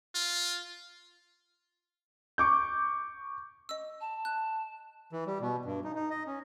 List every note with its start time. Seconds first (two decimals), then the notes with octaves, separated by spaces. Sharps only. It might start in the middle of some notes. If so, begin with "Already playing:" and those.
0.15 F4
2.38 C#6 D6 G6
3.69 D#5 E6
4.00 A5
4.25 F#6
5.12 E3
5.27 G3
5.41 B2
5.65 G2
5.84 D#4
5.95 D#4
6.11 D#5
6.27 C#4